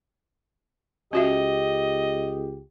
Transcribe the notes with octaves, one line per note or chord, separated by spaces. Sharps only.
C#2 C#4 F#4 G4 D#5 E5